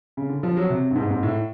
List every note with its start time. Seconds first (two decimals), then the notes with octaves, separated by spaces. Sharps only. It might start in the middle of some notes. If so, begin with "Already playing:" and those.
0.17 C#3
0.29 D3
0.43 F3
0.57 F#3
0.70 C3
0.91 G2
0.96 G#2
1.11 G#2
1.23 A2